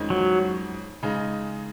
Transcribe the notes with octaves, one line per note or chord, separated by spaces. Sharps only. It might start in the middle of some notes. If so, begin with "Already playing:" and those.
Already playing: F2 D#3 G#3 C#4 G#4
F#3
C#3 G#3 D#4